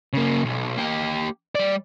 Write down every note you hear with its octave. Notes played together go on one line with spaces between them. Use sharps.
C#3 A#3
B1
A#3 G4
G3 D5